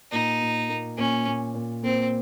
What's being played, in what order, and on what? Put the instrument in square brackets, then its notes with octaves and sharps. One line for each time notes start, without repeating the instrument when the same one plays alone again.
[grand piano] A#2 [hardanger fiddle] D#4
[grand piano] A#2
A#3
[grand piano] A#2 [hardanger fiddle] C#4
[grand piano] A#2
A#2
[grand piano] A#3 [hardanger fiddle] C4